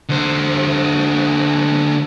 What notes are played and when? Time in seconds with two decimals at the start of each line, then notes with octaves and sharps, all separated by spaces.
0.09 D3 C5